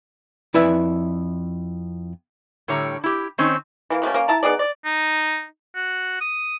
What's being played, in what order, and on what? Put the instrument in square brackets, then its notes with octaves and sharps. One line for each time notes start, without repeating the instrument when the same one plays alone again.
[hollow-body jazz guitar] F2 E4 B4 D5 E5
[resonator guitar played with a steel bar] A2 D3 G3 C#5 A#5
E4 G4
D#3 C4 C#4 D#4
[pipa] E3 A#3
B2 A3 A#3 C#4
A#3 C#4
E4 A5 A#5
B3 D#4 G#4 D5
D5
[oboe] D#4
F#4
D#6